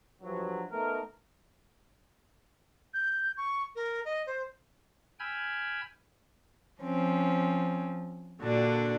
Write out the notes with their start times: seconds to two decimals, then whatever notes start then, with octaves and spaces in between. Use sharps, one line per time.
0.22 G2 F3 F#3
0.70 A3 B3 D#4 A#4
2.94 G6
3.37 C#6
3.76 A#4
4.05 D#5
4.27 C5
5.19 G5 G#5 B5 E6 F6 G#6
6.81 F3 C4 C#4
8.41 A#2 D3 D4 F#4